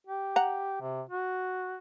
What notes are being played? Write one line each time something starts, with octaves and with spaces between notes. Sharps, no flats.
G4
F#5 A#5
C3
F#4